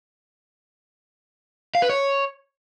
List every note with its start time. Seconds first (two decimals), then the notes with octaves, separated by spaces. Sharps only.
1.75 F5
1.82 B4
1.90 C#5